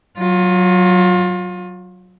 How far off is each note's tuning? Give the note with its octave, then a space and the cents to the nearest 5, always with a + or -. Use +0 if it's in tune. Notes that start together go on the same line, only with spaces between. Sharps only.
F#3 +0 F4 +25